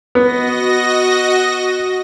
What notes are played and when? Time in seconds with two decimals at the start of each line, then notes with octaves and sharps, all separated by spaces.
0.15 B3 F#4 D#5 A#6